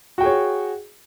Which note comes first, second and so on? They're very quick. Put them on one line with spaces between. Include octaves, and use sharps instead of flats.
F#4 G5 G#4 C#5